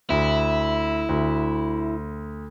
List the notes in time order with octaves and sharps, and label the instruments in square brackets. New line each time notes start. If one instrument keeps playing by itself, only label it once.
[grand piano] D2 [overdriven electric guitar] E4
[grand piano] D2